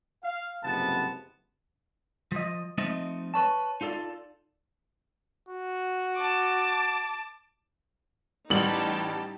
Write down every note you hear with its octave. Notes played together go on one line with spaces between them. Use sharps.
F5
F#1 F2 G#2 C3 B3 A5
F3 D#5
F3 A3 C4 D#4 D#5
B4 C#5 A5
D#4 F4 A4 D5
F#4
A5 D6
A1 G3 D#4 G4 A5 F#7